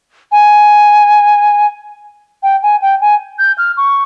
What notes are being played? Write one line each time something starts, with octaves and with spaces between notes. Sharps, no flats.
G#5
G5
G#5
G5
G#5
G6
F6
C#6